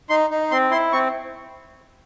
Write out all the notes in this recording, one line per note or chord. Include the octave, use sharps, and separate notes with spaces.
D#4 C6
D#4
C4 C6
E4 C6
C4 C#6